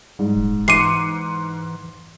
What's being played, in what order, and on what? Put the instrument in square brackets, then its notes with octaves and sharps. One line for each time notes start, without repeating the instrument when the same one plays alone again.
[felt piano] G#2 [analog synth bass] G3
[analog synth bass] D#1
[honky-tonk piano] G#2 D6 C#7 [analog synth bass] E3 [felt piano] C6 [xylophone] C7 D#7